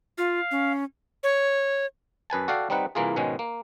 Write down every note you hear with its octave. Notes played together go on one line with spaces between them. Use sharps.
F4 F5
C#4
C#5
F#2 B4 G#5 A5
F#4 A4 D5 F5 G5
G3 C4 D#4 B4 F#5
C2 E3 A#3 F4 G#4
G#2 B2 D#3 G#3 C#4
A#3